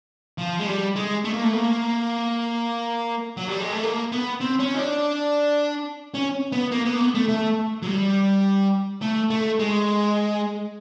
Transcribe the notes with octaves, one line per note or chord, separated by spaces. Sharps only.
F3
G#3
G3
G#3
A3
A#3
A3
A#3
F#3
G3
G#3
A3
A#3
B3
C4
C#4
D#4
D4
C#4
B3
A#3
B3
A#3
B3
A3
A3
F#3
G3
A3
A3
G#3